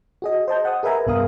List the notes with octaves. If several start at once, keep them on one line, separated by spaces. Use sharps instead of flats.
F#4 G#4 D#5
C5 D#5 A5 G6
F#5 D#6
G#4 A#4 B4 E5 G#5 A#5
C2 G2 B3 A#4 F5 D#6